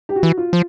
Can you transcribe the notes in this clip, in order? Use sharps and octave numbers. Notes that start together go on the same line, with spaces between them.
G4
F#4
E3
F4
F3